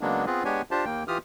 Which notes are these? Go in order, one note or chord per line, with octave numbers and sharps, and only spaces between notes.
C#3 F#3 G#3 A#3 B3 D4
B3 C4 F4 G#4 B4
G#3 B3 D4 G4 C#5 G#5
D4 F4 G4 C5 A5
D#2 A#3 G5
E3 F4 G4 D#6 F6